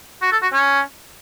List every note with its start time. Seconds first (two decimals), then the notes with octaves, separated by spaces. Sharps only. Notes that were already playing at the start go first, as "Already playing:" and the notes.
0.22 F#4
0.32 A4
0.42 F#4
0.53 C#4